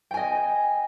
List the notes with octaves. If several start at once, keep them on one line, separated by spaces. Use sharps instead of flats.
D#5 G5 G#5